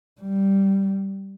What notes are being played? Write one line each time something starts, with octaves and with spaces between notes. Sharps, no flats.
G3